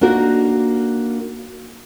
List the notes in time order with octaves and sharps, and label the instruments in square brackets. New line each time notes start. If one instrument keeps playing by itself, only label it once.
[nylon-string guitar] A#3 D4 D#4 F4 F#4 A#4